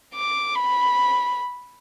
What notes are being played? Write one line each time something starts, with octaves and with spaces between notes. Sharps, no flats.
D6
B5